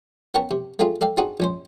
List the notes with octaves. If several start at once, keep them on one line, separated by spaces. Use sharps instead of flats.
B3 C#4 A#4 G5 A5 C#6
C3
A3 C4 D4 F4 G#4
A4 D5 F5 G5
C4 D4 D#4 F#4 G#4
A#1 C#4 C5